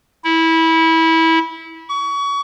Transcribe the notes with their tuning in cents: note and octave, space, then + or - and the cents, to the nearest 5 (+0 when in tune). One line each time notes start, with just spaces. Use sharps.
E4 -20
C#6 +30